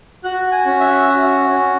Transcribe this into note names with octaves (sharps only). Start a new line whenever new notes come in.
F#4 F#6
G#5
C#4
E5
F#4
C#4